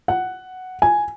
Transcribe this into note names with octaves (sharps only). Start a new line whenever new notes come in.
F#5
G#5